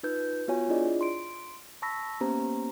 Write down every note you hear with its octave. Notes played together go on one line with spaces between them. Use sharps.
D#4 F4 B4 G6
B3 F4 F#4 C#5 G#5
D4 E4 F4 G#4 D5 D#5
C6 D7
A5 B5 C#6 E6 A#6 B6
A#3 B3 C#4 G4 C5 A#5